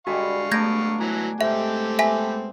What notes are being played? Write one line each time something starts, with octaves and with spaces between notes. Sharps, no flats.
D3 G3 G#3 F#4 F5 C#6
F#3 A3 B3 D4 G6 G#6 A#6 D7
E3 F#3 G#5 A#5
G#2 C4 G4 A4 E5
B3 E5 G#5 B6